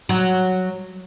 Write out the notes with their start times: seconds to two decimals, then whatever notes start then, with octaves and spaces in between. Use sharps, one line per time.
0.09 F#3